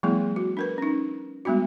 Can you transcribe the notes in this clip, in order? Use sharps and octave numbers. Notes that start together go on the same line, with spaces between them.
F3 G3 A3 B3 E4 G#4
F#4
D4 A#4 B4
C#4 D#4
G3 G#3 B3 D4 F#4